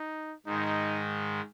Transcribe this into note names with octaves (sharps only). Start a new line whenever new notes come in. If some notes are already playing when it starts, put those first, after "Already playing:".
Already playing: D#4
G#2 D#3 G#3 D#4